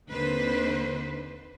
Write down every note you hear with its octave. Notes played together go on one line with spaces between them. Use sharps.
D#2 D3 D#3 C4 B4 C5